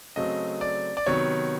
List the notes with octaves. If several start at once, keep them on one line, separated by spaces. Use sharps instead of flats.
C#3 F#3 A3 C4 D#5
D5
D5
C3 D#3 F#3 B3 C#5